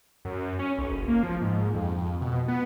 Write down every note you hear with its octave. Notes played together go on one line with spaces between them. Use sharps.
F#2
C#4
B1
F#1
A#3
F3
G#2
F2
F2
B2
B3